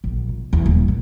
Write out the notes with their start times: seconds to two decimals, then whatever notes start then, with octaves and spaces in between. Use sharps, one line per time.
0.04 A#1
0.29 B2
0.53 E2
0.66 D#1
0.88 A#2